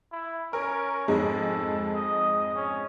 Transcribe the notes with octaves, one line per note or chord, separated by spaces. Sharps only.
E4
C#4 A#4
F2 G#2 G#3 A4
D#5
C#4